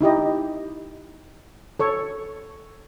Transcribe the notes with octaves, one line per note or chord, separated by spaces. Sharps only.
D#4 E4 G4 D#5
A4 C#5 C#6